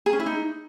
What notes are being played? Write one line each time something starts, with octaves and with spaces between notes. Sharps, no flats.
G#4
C#4
E4
D#4